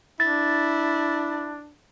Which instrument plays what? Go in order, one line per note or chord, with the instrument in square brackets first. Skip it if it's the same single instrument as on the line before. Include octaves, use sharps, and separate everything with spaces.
[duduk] D4 [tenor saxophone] E4 [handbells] A6